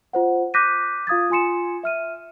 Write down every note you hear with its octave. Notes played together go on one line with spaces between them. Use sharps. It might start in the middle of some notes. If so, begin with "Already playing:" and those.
F4 C5 F#5
D6 F#6 G6 A#6 B6 D#7
F4 F5 D#6 G#6 A6
F4 G#5 C6 C#7 E7
E5 F6 D#7